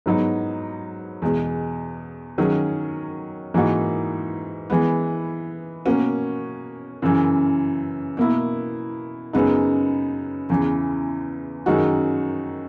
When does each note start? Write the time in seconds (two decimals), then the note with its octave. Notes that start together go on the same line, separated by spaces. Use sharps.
0.06 G#2 F#3 B3 D#4
1.22 E2 B2 G#3
2.38 D#3 F#3 C#4 G#4
3.54 G#2 E3 A#3 D#4 F#4
4.70 E3 G#3 B3
5.85 B2 A#3 C#4 F#4
7.02 F#2 C#3 E3
8.17 B2 A#3 E4
9.33 F#2 C#3 G#3 B3 D#4
10.50 E2 C#3 E3
11.66 F#2 D#3 G#3 D#4 F#4